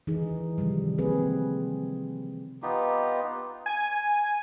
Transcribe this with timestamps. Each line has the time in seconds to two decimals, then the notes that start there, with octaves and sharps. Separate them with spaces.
0.07 E3 D#4 G#4
0.58 C3 D#3 F3 G3
0.98 A#3 C4 G#4 B4
2.62 B3 D#4 F4 G4
3.66 G#5